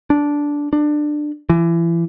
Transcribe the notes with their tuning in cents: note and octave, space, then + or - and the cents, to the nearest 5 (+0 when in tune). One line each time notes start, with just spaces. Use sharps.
D4 -10
D4 +20
E3 +30